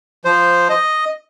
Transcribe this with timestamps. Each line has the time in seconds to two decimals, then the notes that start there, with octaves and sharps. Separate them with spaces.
0.25 F3 C5
0.69 D#5